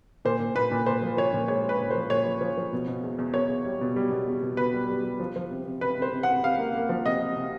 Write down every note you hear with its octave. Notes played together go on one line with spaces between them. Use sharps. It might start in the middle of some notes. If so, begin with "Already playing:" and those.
A#2 C5
A#2
A#2 B4
A#2
A#2 C5
F3
F3 C#5
A#2
G#3 C#5
G#3
B4
A#2
C5
F3
A#2 C#5
F3
F3
F3
B2
B2
E2
E2
E2 C#5
E2
G3
B2
G3
B2
E2
B2
B2 B4
G3
G3
G3
F3
F3
C3
C3
C3 B4
C3
C5
C3
F#5
C3
C3 F5
A#3
A#3
F3
C3 D#5
C3
C3